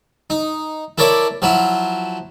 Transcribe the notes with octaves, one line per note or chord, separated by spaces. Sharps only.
D#4
E4 A4 A#4 C#5 D5 E5
F3 F#3 E4